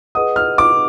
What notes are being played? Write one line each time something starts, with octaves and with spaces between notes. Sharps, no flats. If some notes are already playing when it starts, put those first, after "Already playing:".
G#4 B4 D#5 F#5 D#6
F6
D6